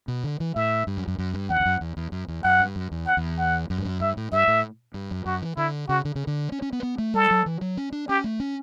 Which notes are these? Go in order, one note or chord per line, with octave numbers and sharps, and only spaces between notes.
B2
D3
E3
A2 E5
G2
F#2
F#2
F#2
G2
E2 F#5
E2
F#2
E2
E2
F#2
E2
F#2 F#5
G2
F#2
E2
F#5
E2
F#5
F#2
G2
F#2
G2 E5
A2
G2 E5
A2
G2
F#2
F#2 F#4
E3
D3 E4
C#3 F#4
D3
C#3
D3
C#4
C#4
B3
B3
A3
G3 A4
F#3
E3
F#3
C#4
D4
C#4 G4
A3
C#4